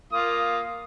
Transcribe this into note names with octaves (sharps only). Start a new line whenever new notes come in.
A#3 F4 D#6